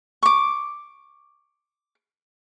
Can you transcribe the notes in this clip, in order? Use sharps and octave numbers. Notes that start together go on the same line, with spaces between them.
C#6 D6